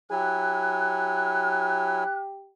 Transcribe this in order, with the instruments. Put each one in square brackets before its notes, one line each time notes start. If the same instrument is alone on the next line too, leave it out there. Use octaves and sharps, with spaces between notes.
[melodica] F#3 E4 G#5 [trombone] G4 [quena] F#6